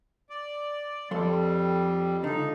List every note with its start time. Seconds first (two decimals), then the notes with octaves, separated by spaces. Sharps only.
0.30 D5
1.11 F2 F3 G3 A4 C6
2.24 C#2 D3 D#4